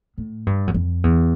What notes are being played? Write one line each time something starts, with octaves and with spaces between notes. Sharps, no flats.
A2
G2
F#2
F2
E2